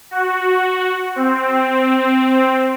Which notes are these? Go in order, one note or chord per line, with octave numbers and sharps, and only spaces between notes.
F#4
C4